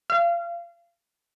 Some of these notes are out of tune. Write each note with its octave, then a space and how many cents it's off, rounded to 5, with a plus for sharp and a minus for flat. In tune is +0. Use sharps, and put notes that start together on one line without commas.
F5 -30